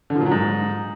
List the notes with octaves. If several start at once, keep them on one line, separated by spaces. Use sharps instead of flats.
D3
F3
A#2
F#3
G#2